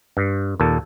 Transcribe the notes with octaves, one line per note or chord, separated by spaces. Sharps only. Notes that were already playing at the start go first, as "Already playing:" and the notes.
G2
D#2 A#2 A4